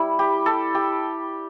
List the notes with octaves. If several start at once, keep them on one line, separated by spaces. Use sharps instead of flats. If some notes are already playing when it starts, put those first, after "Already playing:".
Already playing: G3 E4
G4
A4
G4